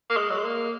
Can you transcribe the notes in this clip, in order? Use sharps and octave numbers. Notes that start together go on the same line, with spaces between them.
A#3
G#3
F#3
G#3
A#3